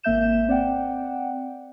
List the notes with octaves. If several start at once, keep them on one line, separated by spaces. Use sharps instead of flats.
G#1 A#3 E5 G6 E7
C4 D5 F#5 G5